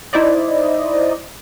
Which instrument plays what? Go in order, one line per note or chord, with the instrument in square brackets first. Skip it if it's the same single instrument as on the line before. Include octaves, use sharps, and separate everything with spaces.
[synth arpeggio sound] D#4 E4 C5 D5 D#5